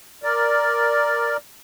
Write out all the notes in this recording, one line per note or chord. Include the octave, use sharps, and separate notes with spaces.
A#4 D5